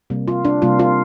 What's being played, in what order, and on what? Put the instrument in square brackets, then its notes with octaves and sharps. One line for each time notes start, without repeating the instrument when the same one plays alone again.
[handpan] C3 G3 A#3
F4
D4
C3 G3 A#3 F4
F4